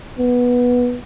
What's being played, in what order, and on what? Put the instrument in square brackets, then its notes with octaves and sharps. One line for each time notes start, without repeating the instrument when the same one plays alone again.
[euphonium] B3